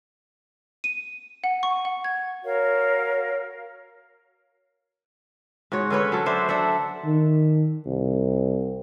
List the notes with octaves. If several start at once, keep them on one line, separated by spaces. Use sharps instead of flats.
D#7
F#5
C#6
F#5
G#6
F#4 A#4 C#5 F5
G#2 F#4 C#5
D3 C#4 B4 C#5
F#3 A4
D4 C5 E5
D4 A4 E5 F#5
D#3
C2